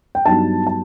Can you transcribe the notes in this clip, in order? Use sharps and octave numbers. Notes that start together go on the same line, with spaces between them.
G5
G2 F#3 B3 D#4 A5
A5